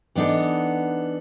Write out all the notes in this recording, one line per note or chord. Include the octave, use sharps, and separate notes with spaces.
E3 B3 D4 D#4 A4